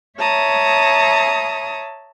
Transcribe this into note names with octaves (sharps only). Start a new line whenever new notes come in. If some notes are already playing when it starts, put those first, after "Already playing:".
C#5 E5 A5 A#5 D#6